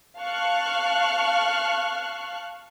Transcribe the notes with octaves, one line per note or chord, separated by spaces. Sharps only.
F5 A5 C#6 F6 F#6